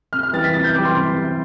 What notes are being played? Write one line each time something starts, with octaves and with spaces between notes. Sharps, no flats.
C3 F6
F6
E3 G3 A6
B6
C3 A6
G6
E3 G3 D6
C6
C3